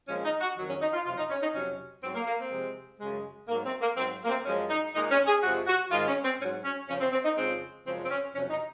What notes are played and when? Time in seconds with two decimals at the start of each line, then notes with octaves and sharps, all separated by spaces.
0.08 A#2 F3 G#3 C#4
0.25 D#4
0.41 F#4
0.57 F2 D#3 F#3
0.69 C#4
0.81 D#4
0.93 F4
1.05 F2 C3 F#3 F4
1.17 D#4
1.30 C#4
1.42 D#4
1.54 F2 C3 F#3 C#4
2.03 G#2 F#3 C4
2.15 A#3
2.27 A#3
2.39 C4
2.51 C3 F3 G#3
3.00 F#2 C#3 G#3
3.48 G#2 A#3
3.51 F#3
3.65 C4
3.81 A#3
3.97 G#2 F#3 C4
4.24 A#3
4.29 C4
4.45 F#2 F3 G#3 C#4
4.70 D#4
4.94 A#2 D#4
4.97 G#3
5.11 C#4
5.27 G#4
5.43 F2 C3 F3 G#3 F#4
5.67 F#4
5.91 G#2 D#3 G#3 F4
6.08 C#4
6.23 C4
6.39 G#2 C#4
6.43 F#3
6.64 C#4
6.88 F2 C#3 F3 C#4
7.01 C4
7.12 C4
7.25 D#4
7.37 F2 C#3 F3 G#3 C4
7.86 F#2 C#3 F3 G#3 C4
8.05 C4
8.10 C#4
8.34 F2 C3 F#3 C#4
8.50 D#4